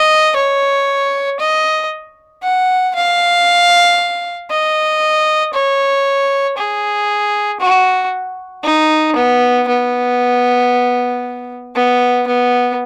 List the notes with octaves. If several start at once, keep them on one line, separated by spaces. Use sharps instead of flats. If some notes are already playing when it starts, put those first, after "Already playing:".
Already playing: D#5
C#5
D#5
F#5
F5
D#5
C#5
G#4
F#4
D#4
B3
B3
B3
B3